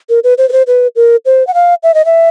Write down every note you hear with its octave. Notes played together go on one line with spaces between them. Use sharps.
A#4
B4
C5
B4
C5
B4
A#4
C5
F#5
F5
E5
D#5
E5